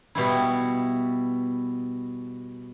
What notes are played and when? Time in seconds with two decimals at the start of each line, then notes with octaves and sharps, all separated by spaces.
0.15 B2 G3 E4